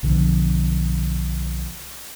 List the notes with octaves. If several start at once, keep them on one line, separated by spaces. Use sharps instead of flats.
B1 D3 F3